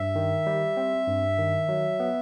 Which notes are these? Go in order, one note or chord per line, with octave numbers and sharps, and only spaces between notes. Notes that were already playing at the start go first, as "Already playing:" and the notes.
Already playing: G2 E5
D#3
G3
C4
G2
D#3
F#3
B3